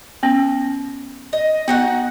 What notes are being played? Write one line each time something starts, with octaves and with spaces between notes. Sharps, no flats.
B3 C#4
D#5
B3 D#4 F#4 F#5